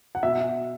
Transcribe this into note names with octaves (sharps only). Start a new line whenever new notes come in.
F#5
B2 E5